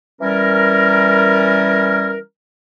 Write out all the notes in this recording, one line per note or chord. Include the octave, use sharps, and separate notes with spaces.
E3 G3 C#4 A#4